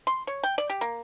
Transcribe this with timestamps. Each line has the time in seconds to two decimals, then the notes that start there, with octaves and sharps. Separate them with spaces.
0.07 C6
0.27 C#5
0.43 G5
0.58 D5
0.70 G4
0.81 A#3